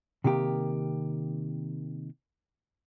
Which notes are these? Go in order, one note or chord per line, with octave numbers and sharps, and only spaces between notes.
C3 D#3 A#3 G4 A#4